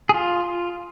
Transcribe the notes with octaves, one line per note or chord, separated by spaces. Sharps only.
G#4
F4